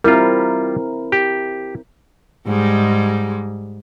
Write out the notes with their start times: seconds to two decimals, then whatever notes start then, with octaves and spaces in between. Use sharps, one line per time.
0.04 G3 C4 E4 F4 A#4
1.12 G4
2.46 G#2 G3 G#3